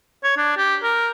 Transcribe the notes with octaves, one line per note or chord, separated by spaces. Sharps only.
C#5
D4
G4
A#4